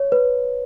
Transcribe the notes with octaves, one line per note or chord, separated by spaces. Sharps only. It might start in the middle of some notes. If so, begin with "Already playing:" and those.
Already playing: C#5
B4